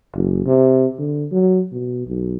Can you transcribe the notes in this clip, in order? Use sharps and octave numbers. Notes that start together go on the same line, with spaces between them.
F#1
C3
D3
F#3
B2
B1